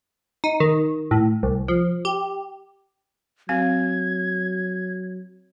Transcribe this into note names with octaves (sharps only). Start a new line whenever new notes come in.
D#4
D#3
A2
C2
F3
G4
F#3 C4 F5 G#6